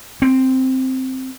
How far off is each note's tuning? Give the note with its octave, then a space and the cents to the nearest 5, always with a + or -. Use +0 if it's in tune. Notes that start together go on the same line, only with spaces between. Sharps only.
C4 +0